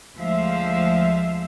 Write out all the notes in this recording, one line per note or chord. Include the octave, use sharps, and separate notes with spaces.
D2 F3 G#3 C5 E5 F5